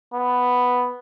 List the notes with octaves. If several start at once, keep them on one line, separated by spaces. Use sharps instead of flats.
B3